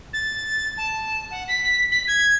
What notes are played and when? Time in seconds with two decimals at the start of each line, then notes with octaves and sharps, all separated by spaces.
0.13 A6
0.77 A5
1.31 F#5
1.48 B6
1.92 B6
2.08 G#6